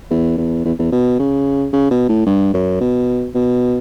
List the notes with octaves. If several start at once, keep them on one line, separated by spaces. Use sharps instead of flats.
E2
E2
E2
E2
B2
C#3
C#3
B2
A2
G2
F#2
B2
B2